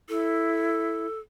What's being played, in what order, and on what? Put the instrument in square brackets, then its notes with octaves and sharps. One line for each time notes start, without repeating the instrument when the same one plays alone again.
[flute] E4 [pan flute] A4